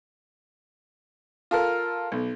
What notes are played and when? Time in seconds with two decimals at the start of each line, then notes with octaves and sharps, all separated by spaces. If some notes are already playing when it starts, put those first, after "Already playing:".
1.51 F4 A4 A#4
2.12 B1